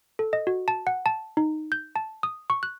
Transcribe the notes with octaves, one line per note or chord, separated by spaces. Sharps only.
A4
D#5
F#4
A5
F#5
A5
D#4
G6
A5
D#6
C#6
F#6